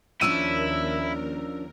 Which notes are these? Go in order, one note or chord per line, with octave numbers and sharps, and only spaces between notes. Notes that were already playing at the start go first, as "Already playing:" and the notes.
D#2 F3 C#4 D4 E4 A#4 E6 D#7